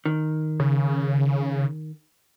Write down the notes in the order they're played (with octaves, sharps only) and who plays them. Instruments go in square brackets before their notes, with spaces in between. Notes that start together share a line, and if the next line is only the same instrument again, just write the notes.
[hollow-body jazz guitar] D#3
[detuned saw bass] C#3